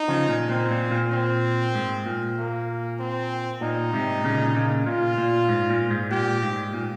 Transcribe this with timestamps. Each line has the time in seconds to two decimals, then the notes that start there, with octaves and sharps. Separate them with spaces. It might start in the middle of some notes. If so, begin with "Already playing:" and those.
Already playing: D#4
0.08 C#3 F3
0.28 A#2
0.49 A#2 C4
0.71 A#2
0.91 A#2
1.12 C4
1.75 G#2
2.06 A#2
2.37 A#3
2.99 C4
3.61 A#2 D#4
3.93 G#2 C3
4.24 A#2 C#3
4.55 A#2 C#3
4.86 A#2 F4
5.18 A#2
5.49 G#2
5.70 A#2
5.90 G#2
6.11 A#2 G4
6.43 G#2
6.74 A#2